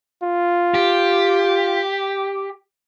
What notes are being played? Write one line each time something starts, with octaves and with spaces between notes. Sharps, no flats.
F4
G4